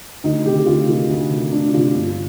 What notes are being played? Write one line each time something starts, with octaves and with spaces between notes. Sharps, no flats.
D2 D#4
C3 D#3 G4
G4
D2 F4
C3 D#3
D2
C3 D#3
D2 D4
C3 D#3 F4
G1